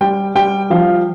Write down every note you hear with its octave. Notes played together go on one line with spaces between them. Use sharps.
G3 G5
G3 G5
F3 F5